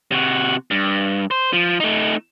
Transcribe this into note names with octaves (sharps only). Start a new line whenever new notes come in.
C3 F#4
G2
C5
F3
A3 D#4